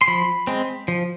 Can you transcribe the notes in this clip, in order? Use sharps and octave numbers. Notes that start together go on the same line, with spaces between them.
C6
F3 B5
G#3 C4
F3